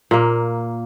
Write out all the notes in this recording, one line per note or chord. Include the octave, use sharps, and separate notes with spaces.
A#2 A#3